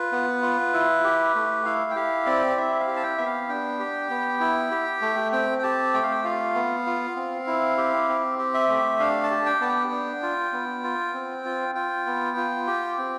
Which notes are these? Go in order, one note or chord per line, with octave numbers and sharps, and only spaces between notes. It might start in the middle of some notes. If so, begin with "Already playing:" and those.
Already playing: F4 B4
B3
F4
E4
G4
A3
E4 F5
G5
G4 F5
C4 D5
E4 E5
F5
G4
A5
G5
B3 E5
F5
D4 G5
G4
B3
E4
G4
A3
C4 G5
G5
G4 A5
A3 G5
F5
G5
F4 F5
B3
F4
C4
E4
G4
C4
G4
E5
A3
D4 F5
A5
G4
G5
B3 A5
G5
D4
F4
B3
F4
C4
F4
F4 G5
B3
F4
G4
C4